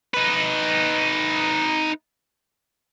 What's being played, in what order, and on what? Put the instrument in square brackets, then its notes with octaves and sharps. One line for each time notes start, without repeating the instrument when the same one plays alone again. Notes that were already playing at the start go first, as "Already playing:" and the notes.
[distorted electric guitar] D#4 B4